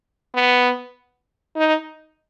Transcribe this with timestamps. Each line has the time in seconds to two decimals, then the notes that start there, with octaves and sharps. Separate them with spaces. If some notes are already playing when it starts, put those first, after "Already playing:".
0.35 B3
1.56 D#4